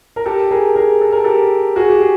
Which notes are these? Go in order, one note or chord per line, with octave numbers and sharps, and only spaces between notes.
A#4
G4 A4
G#4 A#4
G#4 A#4
A4
A#4
G4 A4
F#4 G#4
G4
G#4